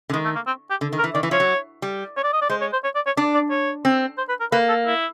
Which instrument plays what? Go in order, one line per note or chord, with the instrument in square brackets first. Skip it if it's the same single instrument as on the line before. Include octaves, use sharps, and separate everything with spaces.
[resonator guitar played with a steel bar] D3
[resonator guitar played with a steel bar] D#3 [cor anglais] G#3
[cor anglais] A3
A#3
C4
G4
[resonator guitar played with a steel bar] D3
D#3
[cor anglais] A#4
[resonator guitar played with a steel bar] E3
[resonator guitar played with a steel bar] D#3 [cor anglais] D5
[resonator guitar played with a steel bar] E3
[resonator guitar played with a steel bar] F3 [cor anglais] C#5
[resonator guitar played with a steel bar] F#3
G3
[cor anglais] C#5
D5
D#5
D5
[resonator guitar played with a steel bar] G#3 [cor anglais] C5
[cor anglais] C#5
C5
C#5
D5
C#5
[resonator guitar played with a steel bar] D4 [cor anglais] D5
[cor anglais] D5
C#5
[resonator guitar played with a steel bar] C4
[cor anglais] C5
B4
A#4
[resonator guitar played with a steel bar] A#3 [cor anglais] B4
[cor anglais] A4
E4